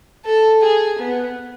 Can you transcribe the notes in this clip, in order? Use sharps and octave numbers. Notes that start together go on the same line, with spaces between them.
A4
G#4
B3